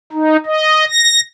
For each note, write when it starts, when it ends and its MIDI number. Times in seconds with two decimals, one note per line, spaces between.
0.12 0.37 63
0.46 0.85 75
0.90 1.21 94